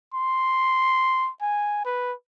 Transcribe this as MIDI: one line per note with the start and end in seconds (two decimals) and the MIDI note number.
0.14 1.30 84
1.42 1.84 80
1.85 2.13 71